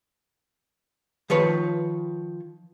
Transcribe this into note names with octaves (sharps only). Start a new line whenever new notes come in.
D#3 F3 B4 C#5